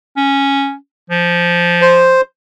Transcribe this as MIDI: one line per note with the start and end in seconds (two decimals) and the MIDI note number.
0.17 0.75 61
1.10 2.17 53
1.82 2.21 72